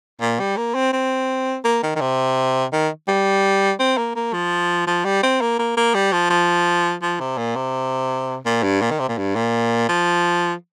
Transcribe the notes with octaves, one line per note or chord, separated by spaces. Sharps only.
A#2
G3
A#3
C4
C4
A#3
D#3
D#3
C3
D#3
G3
C4
A#3
A#3
F3
F3
G3
C4
A#3
A#3
A#3
G3
F3
F3
F3
C3
A#2
C3
A#2
G2
A#2
D#3
C3
A#2
G2
A#2
F3